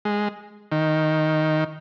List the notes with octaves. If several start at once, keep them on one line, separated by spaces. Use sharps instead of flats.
G#3
D#3